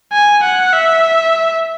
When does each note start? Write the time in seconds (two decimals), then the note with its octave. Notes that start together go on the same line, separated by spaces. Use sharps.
0.13 G#5
0.43 F#5
0.73 E5